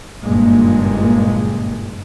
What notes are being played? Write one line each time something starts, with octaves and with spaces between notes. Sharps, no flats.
F#1 G2 A#2 G#3